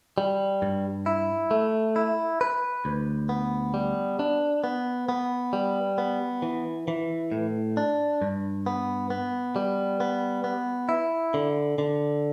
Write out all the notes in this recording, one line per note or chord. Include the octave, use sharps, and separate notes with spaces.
G3
G2
E4
A3
E4
B4
D2
B3
G3
D4
B3
B3
G3
B3
E3
E3
A2
D4
G2
B3
B3
G3
B3
B3
E4
D3
D3